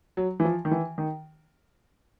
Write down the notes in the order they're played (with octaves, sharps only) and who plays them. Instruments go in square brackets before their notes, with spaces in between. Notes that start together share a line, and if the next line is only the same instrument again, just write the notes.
[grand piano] F#3
E3
F3
D#3
E3
D#3